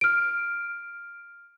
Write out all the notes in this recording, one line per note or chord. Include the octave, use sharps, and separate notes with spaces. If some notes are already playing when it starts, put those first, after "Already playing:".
F6 D7